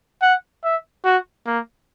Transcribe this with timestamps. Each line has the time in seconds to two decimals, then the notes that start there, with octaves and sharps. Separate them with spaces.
0.22 F#5
0.64 E5
1.05 F#4
1.46 A#3